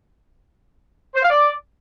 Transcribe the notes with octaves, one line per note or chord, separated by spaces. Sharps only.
C5
F5
D5